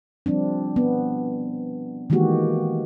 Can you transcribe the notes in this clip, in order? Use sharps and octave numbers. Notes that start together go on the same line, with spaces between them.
F3 G3 C4 D4
B3
D#3 E3 G#3 A#3 F#4 G4